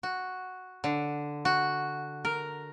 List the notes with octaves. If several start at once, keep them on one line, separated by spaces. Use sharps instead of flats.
F#4
D3
F#4
A#4